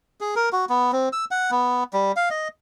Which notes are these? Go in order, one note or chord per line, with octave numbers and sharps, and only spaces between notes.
G#4
A#4
F#4
B3
C4
E6
F#5
B3
G3
F5
D#5